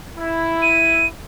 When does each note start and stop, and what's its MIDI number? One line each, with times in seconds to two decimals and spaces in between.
0.18 1.08 64
0.62 1.07 99